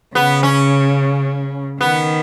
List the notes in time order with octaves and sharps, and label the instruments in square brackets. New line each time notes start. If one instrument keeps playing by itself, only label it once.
[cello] C#3 [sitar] B3
[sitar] C#4
[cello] D#3 [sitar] B3